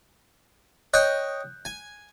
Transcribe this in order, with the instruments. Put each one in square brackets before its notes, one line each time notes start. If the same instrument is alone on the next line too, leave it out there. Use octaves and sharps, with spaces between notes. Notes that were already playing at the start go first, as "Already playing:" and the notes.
[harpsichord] C#5 D#5 G5 [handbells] F#6 G6
[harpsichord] G#5